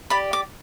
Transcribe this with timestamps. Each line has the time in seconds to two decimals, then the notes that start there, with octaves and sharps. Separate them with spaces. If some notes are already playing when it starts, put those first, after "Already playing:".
0.10 G4 D5 B5
0.33 D6